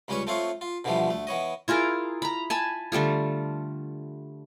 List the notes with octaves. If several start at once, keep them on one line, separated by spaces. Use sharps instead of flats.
C#2 G3 C#4 B4 C#5 C#6
A3 C4 F4 C#5 F5
F4
B2 D3 E3 F3 G3 A3
D2 A3
E3 B3 C#5 D#5
E4 F4 G#4 A#4
A#5 B5
G#5 A5 B5
D3 G3 A3 F4